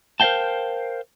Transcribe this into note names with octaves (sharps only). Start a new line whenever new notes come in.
A#4 C5 D#5 F5 G5 A5